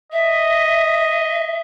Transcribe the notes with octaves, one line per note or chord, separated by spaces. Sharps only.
D#5 E5